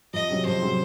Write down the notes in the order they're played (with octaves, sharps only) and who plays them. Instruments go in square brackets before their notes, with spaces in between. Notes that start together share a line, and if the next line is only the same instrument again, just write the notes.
[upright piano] F2 [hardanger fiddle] D#5
[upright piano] C3 F#3 C#4
[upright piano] F2 [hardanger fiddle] C5
[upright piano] C3 F#3 C#4